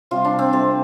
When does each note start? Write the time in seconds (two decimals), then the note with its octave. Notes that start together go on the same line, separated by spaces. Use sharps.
0.11 C3 G3 F4
0.25 D4
0.39 C4
0.53 C3 G3 A4